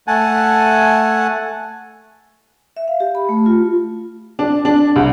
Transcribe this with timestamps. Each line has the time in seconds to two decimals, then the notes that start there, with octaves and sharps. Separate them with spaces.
0.07 A3 F#5 G#5 A5
2.77 E5
2.88 F5
3.00 G4
3.15 B5
3.29 A3
3.46 F4
4.39 D4
4.65 D4
4.96 C2